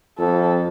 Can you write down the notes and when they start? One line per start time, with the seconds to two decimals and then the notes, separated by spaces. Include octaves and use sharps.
0.18 F2 A4